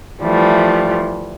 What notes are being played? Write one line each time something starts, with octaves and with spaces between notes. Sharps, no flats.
E3 F3 G3 A3